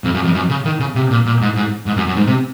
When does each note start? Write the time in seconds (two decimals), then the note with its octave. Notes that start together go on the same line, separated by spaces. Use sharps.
0.04 F2
0.14 F#2
0.24 F2
0.35 F#2
0.49 C#3
0.65 D#3
0.80 C#3
0.95 C3
1.11 A#2
1.25 A#2
1.41 G#2
1.56 G#2
1.86 G#2
1.96 F#2
2.07 F#2
2.16 G#2
2.26 C3